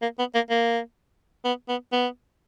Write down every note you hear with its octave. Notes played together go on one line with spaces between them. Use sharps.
A#3
B3
A#3
A#3
B3
B3
B3